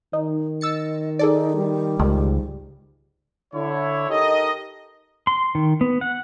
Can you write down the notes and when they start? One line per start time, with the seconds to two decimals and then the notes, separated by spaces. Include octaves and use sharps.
0.13 D#3 D#4
0.61 D#5 E6 A6 C#7
1.19 D#4 G#4 A4 D5
1.56 G3
1.99 C#2 G#2 D3 D#3
3.54 D3 E4 C#5
4.10 D#4 G4 A4 A#4 D#5
5.27 C6
5.55 D#3
5.81 B3
6.01 F#5